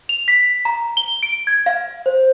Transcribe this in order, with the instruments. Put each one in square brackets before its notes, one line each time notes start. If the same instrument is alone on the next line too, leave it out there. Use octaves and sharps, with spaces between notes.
[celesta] F7
B6
A#5
G7
D7
G#6
F5
C5